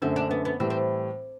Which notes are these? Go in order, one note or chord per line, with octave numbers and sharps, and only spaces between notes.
F#2 D3 A3 C4
D4
B3
B3
A2 E3 G3 C4
C4